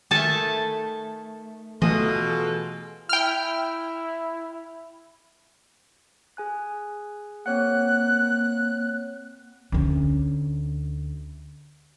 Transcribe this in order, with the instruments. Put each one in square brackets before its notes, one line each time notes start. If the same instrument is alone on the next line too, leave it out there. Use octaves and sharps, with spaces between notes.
[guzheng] D#3 A3 [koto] A4 G#5 A5
[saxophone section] B2 F4 A4 [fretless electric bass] E3 A3 [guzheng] G#4 [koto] D#5
[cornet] E4 [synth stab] G5 F6
[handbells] G#4 G#5 F#6
[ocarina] A#3 [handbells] C4 C#5 F#5 [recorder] F#6
[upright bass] D2 C#4